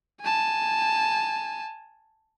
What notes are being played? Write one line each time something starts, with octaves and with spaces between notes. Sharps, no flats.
G#5 A5